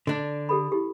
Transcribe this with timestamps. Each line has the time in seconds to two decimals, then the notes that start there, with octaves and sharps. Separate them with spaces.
0.07 D3 D4 D5
0.49 G4 A4 B5
0.72 E4 G4